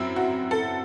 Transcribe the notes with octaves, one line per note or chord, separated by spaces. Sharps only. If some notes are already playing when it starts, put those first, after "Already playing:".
Already playing: F#2 F#3 C4 E4
F#4
A4